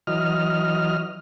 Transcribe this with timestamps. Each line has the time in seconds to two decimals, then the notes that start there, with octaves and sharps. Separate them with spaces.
0.07 E3 F#3 D#5 F6